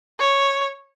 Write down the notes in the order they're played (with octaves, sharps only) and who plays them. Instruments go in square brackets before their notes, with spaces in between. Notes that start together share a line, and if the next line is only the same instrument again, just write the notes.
[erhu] C#5